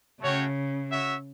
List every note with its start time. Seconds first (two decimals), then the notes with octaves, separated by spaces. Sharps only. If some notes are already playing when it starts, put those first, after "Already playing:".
0.21 C#3 A3 C#4 F#4 C#5 G5
0.91 F#4 C#5 E5